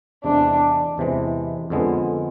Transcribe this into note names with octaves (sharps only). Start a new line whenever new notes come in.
E2 C3 E3 G#3 D4
E2 C3 E3 G#3
F2 D3 G#3 B3